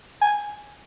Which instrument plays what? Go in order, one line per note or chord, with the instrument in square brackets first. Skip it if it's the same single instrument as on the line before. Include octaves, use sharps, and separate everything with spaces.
[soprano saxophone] G#5